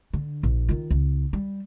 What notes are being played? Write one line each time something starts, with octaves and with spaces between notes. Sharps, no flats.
D3
A#1
D#3 F4
C#2
G3